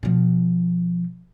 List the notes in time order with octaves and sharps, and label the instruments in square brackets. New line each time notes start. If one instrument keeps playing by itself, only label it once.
[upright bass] B2 F3